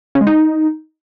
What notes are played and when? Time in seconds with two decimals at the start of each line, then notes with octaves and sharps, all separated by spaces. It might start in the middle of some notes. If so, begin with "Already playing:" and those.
0.15 C#3
0.21 G#3
0.27 D#4